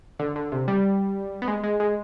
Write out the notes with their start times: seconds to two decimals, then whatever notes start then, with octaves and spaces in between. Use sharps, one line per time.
0.19 D3
0.36 D3
0.52 C3
0.68 G3
1.42 B3
1.48 G#3
1.64 G#3
1.80 G#3